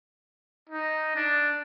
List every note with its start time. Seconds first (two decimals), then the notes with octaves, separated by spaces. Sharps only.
0.69 D#4
1.15 D4